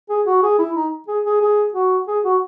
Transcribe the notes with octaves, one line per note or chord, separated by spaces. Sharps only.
G#4
F#4
G#4
E4
D#4
G#4
G#4
G#4
F#4
G#4
F#4